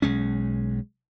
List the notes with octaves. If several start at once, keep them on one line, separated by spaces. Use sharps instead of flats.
B1 G#3 C#4